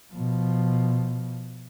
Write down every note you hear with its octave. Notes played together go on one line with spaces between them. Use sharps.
B2 F3